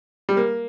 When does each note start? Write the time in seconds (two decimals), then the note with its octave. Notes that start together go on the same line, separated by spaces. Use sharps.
0.29 G3
0.37 A#3